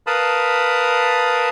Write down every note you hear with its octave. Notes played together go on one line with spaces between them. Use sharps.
A#4 B4 F5 A5 B5 D#6